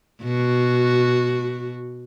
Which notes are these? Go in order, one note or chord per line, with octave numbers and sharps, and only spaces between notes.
B2 F#4